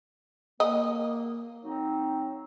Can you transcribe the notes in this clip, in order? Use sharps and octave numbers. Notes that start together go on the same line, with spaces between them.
A#3 D#5
F#3 C4 D#4